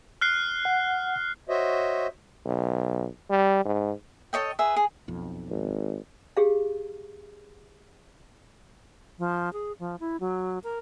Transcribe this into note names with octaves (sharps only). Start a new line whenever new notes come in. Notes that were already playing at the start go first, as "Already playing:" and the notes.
F6 F#6 C7
F#5
F#4 C5 C#5 D#5 E5
B1
G3
G#2
A4 C#5 D#5 G5
G#4 B4 E5
G#4
B1 F2
G#1
G4 G#4 F5
F3
G#4
F3
E4
F#3
A#4